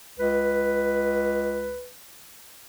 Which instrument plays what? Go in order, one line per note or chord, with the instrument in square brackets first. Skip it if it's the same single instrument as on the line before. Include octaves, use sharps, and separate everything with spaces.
[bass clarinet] C#2 [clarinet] B4